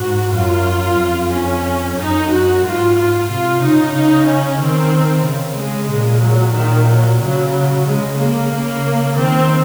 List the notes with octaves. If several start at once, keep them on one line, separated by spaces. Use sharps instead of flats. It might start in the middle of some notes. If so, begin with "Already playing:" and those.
Already playing: G#2 F#4
F#2 F4
F2
C#4
F#2 D#4
F#2 F#4
G#2 F4
F4
C3 F4
C#3 D#4
D#4
C#4
D#3 C4
C#3
G#3
A#2
F#3
A#2 D#3
F#3
C#3 F#3
C#3 G#3
A#3
C#3 A#3
D#3 C4